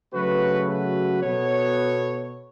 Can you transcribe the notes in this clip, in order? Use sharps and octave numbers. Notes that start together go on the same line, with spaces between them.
C#3 F#3 A3 F#4 B4
F#4 B4
B2 B3 A4 C#5